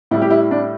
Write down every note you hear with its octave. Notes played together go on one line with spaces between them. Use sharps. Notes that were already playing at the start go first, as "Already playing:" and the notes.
A2 G3 E4
G4
E4
D4